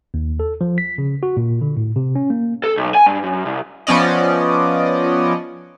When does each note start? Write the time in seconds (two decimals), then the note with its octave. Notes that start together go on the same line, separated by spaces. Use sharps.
0.14 D#2
0.40 A4
0.61 F3
0.78 B6
0.98 C#3
1.23 F#4
1.37 A#2
1.61 D3
1.77 A2
1.96 C3
2.15 C#4
2.30 A#3
2.64 A4
2.77 B1
2.95 G#5
3.06 G2
3.24 F#2
3.46 C2
3.87 F3 B3 C#4 D5 D#5